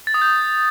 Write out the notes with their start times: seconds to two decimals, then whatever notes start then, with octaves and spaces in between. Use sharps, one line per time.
0.07 A6
0.14 D#6
0.22 G6